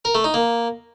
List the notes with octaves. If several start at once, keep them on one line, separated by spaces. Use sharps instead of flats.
A#4
A3
D#4
A#3